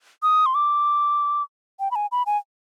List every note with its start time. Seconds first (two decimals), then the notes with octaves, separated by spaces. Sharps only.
0.23 D#6
0.46 C6
0.55 D6
1.80 G5
1.91 B5
1.96 G#5
2.12 B5
2.26 G#5